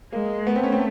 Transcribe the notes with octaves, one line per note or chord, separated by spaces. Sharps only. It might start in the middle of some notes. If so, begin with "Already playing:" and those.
G#3 A#3
A3 B3
C4
C#4
C4